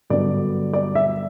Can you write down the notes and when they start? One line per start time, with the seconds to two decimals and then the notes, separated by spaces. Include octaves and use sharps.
0.10 G2 D3 F#3 B3 D5
0.73 D5
0.95 E5